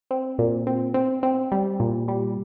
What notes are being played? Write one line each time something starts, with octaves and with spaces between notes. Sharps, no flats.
C4
A#2
C4
C4
C4
G3
A#2
G3